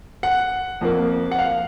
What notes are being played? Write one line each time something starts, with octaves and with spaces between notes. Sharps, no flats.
F#5
F2 F3 A#3
F#5
F5